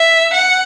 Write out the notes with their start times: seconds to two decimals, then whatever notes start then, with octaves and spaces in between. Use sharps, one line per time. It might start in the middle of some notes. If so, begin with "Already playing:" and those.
Already playing: E5
0.34 F#5